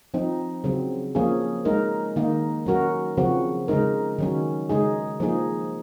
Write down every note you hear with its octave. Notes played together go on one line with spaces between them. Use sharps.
F3 C4 D#4
C#3 F#3 C4
F3 A#3 C#4 G#4
G#3 D#4 A#4
D#3 A#3 D#4
F#3 C#4 F#4 A#4
C#3 F3 C4 F#4
C#3 G#3 D#4 A#4
D#3 F#3 C#4
C#3 G#3 D#4 G#4
F3 A#3 D#4 G#4